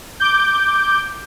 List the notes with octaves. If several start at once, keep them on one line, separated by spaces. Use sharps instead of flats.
D6 G6